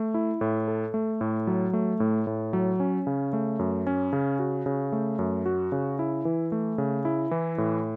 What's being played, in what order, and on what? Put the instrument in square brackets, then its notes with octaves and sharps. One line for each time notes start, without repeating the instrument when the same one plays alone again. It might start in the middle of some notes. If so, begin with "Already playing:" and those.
Already playing: [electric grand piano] A3
E4
A2
A4
A3
A2
F#3
A3
A2
A2
F#3
C#4
C#3
A3
F#2
C#4
C#3
F#4
C#3
A3
F#2
F#4
C#3
E4
E3
A3
C#3
E4
E3
A2